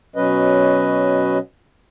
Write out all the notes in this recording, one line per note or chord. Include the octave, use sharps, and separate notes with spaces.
B2 F#3 C#4 B4 D#5